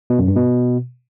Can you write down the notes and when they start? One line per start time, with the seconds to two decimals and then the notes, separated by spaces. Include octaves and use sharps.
0.10 B2
0.19 F#2
0.28 G2
0.36 B2